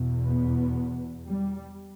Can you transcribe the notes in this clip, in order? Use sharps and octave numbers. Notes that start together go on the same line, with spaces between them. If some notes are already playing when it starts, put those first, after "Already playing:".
Already playing: E2 B2
B3
G3